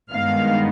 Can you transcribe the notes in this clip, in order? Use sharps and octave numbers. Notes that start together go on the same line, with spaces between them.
G2 D#3 G#3 B3 F5